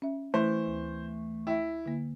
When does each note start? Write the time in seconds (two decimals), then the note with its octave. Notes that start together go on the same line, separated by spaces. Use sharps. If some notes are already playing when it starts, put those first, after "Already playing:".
0.02 C#4 E5
0.34 E3 A3 C5
0.66 D2
1.47 E4 E5 G5
1.86 D3 A#3